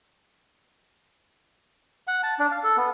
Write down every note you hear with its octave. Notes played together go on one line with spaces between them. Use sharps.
F#5
A5
D4
F5
A4
B3